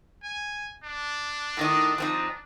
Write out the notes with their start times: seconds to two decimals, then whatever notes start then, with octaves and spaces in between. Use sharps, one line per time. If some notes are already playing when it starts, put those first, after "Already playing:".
0.23 G#5
0.84 D4
1.57 A2 D#3 D#4
1.98 F3 C4 D#4